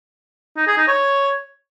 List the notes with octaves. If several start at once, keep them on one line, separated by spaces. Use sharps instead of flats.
D#4
G#4
D#4
C#5